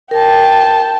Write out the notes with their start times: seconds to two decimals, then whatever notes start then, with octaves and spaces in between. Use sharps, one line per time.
0.11 A#4 G5 A5